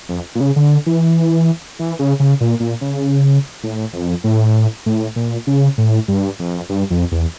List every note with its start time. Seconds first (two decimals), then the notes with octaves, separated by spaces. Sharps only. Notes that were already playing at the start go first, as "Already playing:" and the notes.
0.09 F2
0.35 A#2
0.40 C#3
0.56 D3
0.86 E3
1.79 E3
1.99 C#3
2.20 C#3
2.41 A#2
2.60 A#2
2.81 C#3
3.63 A2
3.93 F2
4.24 A2
4.86 A2
5.16 A#2
5.47 C#3
5.78 A2
6.08 G2
6.39 F2
6.69 G2
6.90 F2
7.12 E2